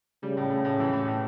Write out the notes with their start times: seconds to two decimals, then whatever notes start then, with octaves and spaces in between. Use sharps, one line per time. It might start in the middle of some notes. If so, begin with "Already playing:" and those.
0.23 C#3 G3
0.37 A2
0.50 A2
0.65 A2
0.80 E3
0.93 A2
1.08 A2